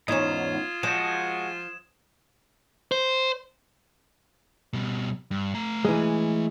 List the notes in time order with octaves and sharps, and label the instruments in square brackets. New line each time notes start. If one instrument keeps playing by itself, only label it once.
[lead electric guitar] E2 G#2 [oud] C#4 D#4 [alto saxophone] F4 [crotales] D#6 G#6 E7
[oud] F3 [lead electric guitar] G#3 F#4 [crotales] E7
[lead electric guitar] C5
B2 G3
G2
A3 A#5
[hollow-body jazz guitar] E3 G#3